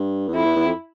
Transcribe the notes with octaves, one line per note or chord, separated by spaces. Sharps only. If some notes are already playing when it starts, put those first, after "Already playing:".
Already playing: G2
E2
F2 E4
E2
E2
F2